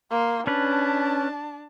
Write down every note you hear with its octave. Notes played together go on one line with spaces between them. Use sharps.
A#3 C6
C#4 D4 B4 A5